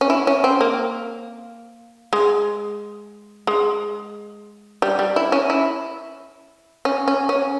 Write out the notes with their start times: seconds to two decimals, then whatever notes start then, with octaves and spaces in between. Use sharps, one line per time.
0.01 C#4
0.10 E4
0.27 C#4
0.44 C4
0.61 A#3
2.13 G#3
3.47 G#3
4.82 G3
4.99 G3
5.16 E4
5.32 C#4
5.50 E4
6.85 C#4
7.08 C#4
7.29 C#4